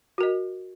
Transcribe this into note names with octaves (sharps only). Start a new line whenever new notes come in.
F#4 A#4 D#5